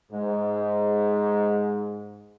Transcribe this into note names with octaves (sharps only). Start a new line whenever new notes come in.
G#2 G#3